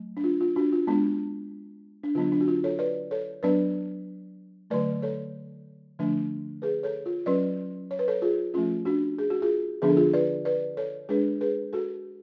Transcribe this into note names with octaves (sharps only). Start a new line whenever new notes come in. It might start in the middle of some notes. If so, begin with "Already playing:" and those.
Already playing: F#3 A3
D4
F4
F4
D4 F#4
F4
G#3 B3 D4
D4
D3 F#3 B3 D4 F4
D4
F#4
F4
A4 C#5
B4 D5
A4 C#5
F#3 B3 D4 B4 D5
D3 F#3 A3 B4 D5
A4 C#5
D3 F3 A3 D4
G#4 B4
A4 C#5
F4
F#3 C#4 B4 D5
C#5
B4
A4 C#5
F4 G#4
F3 A3 C#4 F4
D4 F#4
G#4
F#4
F4 G#4
D3 F3 B3 D4 G#4
A4
F4 G#4
B4 D5
B4 D5
A4 C#5
G#3 D4 G#4 B4
G#4 B4
F#4 A4